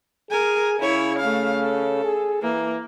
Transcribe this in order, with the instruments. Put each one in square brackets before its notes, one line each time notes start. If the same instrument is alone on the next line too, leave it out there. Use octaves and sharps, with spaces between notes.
[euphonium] G#4 [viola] A#4 G#5
[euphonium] C#3 [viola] E4 C#5
[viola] A3 F5
A4
[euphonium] G#4
[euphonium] E3 [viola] A#3